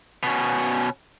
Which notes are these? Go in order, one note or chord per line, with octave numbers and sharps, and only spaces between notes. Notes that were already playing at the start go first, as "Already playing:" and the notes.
B2 C#4